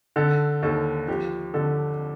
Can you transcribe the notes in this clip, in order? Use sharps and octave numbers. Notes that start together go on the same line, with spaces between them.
D3 A4
D#2 A4
F3 G4
D3 A4